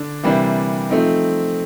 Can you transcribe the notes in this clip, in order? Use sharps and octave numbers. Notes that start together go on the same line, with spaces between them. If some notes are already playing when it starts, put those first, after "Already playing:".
Already playing: D3 D4
C3 E3 G3 A#3 D4
F3 A3 C4 D#4